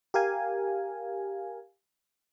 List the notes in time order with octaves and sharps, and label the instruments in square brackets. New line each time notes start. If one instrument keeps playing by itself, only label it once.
[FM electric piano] G4 A#4 F5 G#5